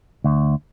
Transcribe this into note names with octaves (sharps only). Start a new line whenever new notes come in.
D2